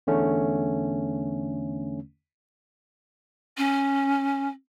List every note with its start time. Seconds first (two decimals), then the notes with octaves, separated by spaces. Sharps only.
0.07 E2 D3 A3 C#4
3.57 C#4